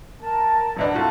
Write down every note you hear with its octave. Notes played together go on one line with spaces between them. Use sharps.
A#4 A5
E1 D2 D4 B4 D#5
C2 F4 F#4 A4